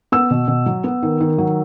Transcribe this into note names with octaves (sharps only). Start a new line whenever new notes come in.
B3 E6
B2
B2
F#3
B3
D#3
D#3
F#3